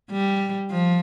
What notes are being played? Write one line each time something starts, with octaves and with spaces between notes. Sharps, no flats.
G3
F3